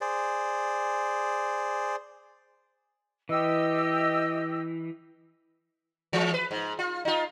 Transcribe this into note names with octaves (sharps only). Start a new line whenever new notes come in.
G#4 C5 D5
E3 G4 D#5 E6
E3 G#3
B4
G#2
F4
D#4 F4